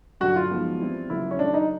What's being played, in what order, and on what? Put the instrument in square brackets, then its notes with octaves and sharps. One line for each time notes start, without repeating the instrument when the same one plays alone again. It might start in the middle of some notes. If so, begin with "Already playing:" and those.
[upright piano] G2 D3 F#3 [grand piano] F#4
[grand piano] F4
[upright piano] F3 G#3 B3 D#4 F#4
E3 G3 C4 E4
[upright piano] C#3 F#3 A#3 [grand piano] E4
[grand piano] C#4
[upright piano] D#3 F#3 A3 [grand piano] D4
[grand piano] D#4